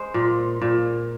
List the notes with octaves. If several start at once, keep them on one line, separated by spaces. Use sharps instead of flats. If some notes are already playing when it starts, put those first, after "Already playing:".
Already playing: G#3 G#4 C5
A#2
A#2